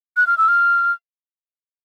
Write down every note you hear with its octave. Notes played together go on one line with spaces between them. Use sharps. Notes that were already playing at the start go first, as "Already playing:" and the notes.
F#6
F6
E6
F6